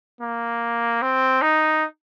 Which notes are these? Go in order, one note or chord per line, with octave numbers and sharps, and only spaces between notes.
A#3
C4
D#4